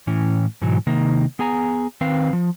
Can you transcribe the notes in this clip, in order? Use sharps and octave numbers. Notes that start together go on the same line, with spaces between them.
A2 E3 C#4
G#2 B2 E3 F#3
C3 D#3 A#3 D#4
B3 G#4 G#5 A#5
D#3 C4 B4 F5
F3